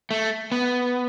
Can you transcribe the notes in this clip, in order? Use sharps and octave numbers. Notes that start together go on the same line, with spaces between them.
A3
B3